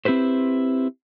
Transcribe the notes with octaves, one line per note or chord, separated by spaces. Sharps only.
C4 E4 G4 B4 C5